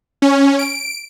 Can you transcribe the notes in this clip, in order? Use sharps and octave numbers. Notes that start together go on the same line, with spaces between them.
C#4
D7